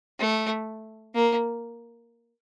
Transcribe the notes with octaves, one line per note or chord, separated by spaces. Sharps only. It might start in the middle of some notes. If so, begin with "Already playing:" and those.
A3
A#3